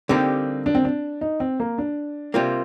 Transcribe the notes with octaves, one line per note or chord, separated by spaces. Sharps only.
D3 G3 A#3 C4 D#4 G4
D4
C4
D4
D#4
C4
A#3
D4
C3 G3 A#3 F4